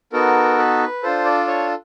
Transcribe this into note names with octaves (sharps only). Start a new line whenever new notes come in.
B3 D#4 F#4 A4 A#4
B4
D4 F4 A4 C5
D5
C#5